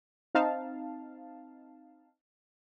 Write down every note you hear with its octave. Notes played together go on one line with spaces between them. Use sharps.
C4 D#4 F5 A5